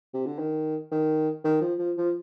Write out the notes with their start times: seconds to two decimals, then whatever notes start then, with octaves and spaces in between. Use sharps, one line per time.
0.14 C3
0.26 D3
0.39 D#3
0.92 D#3
1.44 D#3
1.61 F3
1.79 F3
1.97 F3